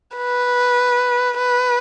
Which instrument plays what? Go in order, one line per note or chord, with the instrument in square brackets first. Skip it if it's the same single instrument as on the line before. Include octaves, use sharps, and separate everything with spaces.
[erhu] B4
B4